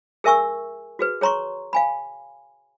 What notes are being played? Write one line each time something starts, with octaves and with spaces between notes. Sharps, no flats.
G#4 A#4 E5 G#5 C#6 E6
F#4 G#4 B4
G#4 C#5 A#5 C6 C#6
F5 G#5 B5